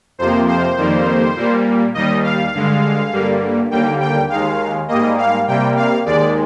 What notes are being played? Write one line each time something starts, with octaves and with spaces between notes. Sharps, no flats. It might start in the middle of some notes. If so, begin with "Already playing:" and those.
F2 C3 F3 A#3 C5
C5
F2 D#3 G3 A#3
A#2 G3 A#3
D#2 D#3 G3 D#5
F5
G2 D3 G#3
G2 D3 G3 A#3
D#2 D3 G3 A#3 G5
G5
D#2 D#3 G#3 F5
G#2 G3 A#3 D#5
F5
C3 G3 A#3 G5
F5
D#2 D#3 G#3 D5